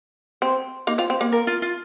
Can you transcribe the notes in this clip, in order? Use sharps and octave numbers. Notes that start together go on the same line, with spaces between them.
C4
A#3 D#4
C4 F4
C4
A#3
A#4
F4
F4